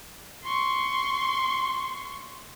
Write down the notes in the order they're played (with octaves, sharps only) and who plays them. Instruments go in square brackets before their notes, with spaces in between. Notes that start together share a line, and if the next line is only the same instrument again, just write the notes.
[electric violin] C6 C#6